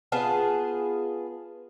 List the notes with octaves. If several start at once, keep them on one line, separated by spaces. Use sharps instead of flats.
B3 F4 G#4 A5